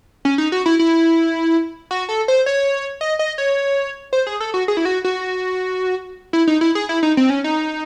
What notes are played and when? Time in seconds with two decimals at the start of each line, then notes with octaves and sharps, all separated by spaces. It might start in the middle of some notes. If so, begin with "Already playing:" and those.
0.25 C#4
0.38 D#4
0.52 F#4
0.66 E4
0.79 E4
1.91 F#4
2.09 A4
2.28 C5
2.46 C#5
3.01 D#5
3.19 D#5
3.38 C#5
4.13 C5
4.27 G#4
4.40 A4
4.54 F#4
4.68 G#4
4.77 E4
4.85 F#4
5.04 F#4
6.33 E4
6.47 D#4
6.61 E4
6.75 G#4
6.89 E4
7.03 D#4
7.17 C4
7.30 C#4
7.44 D#4